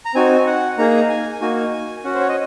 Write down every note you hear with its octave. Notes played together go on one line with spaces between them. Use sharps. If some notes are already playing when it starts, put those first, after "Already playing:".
A#5
C4 D#4 F#4 G#5
F#5
A#3 D#4 G#4 A#5
G#5
A#3 D#4 F#4 G#5
G#5
C#4 F#4 F#5
C5
C#5
D#5